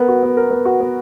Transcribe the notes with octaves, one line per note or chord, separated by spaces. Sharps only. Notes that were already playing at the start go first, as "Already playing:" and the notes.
Already playing: B3 A#4
F#4
B3
A#4
B3
F#4
B3